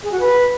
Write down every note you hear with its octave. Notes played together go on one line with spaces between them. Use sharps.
G#4
F#4
B4